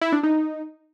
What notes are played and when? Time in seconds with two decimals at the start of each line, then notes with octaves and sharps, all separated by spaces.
0.01 E4
0.12 D4
0.23 D#4